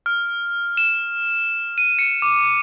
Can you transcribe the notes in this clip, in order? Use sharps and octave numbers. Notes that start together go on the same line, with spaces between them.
F6
E7
D#7
C#7
D6